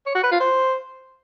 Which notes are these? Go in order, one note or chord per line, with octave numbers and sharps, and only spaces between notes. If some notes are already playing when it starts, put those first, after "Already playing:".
C#5
F#4
B4
F4
C5